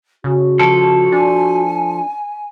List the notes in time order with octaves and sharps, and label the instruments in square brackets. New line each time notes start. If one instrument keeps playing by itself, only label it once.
[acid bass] C#3 [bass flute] F#4
[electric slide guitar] F3 A4
[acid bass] D4 [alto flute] G#5